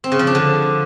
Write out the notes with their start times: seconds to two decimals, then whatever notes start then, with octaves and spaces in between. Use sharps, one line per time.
0.04 C4
0.12 C#3
0.19 F3
0.27 D4
0.35 D3